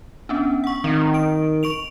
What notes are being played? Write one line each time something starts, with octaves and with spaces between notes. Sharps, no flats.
B3 C#4 D4
F#5 C#6
D#3 C4
D7
C#6 D7 F7